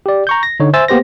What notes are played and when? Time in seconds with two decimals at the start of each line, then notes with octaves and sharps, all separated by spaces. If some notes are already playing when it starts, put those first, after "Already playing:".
0.06 G4 D5
0.27 A#5 C#6 G6
0.43 A#6
0.60 D3 D#4 C#5
0.74 C5 E5 G#5 E6 A6
0.88 A#3 B3 G4 C5 A#6